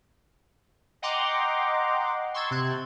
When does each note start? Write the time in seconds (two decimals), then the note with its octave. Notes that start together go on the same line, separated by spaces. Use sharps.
1.02 D#5 F#5 G5 A#5 C6 D6
2.34 C6 C#6 E6 G#6 A6
2.51 C3 C4 F#6 G#6